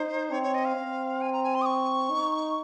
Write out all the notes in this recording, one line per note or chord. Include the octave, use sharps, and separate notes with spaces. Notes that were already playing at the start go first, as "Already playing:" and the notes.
Already playing: D#4 C5
C4 C#5
C#5
D#5
F5
C4
G#5
A#5
G#5
C6
D#6
C#6
D#4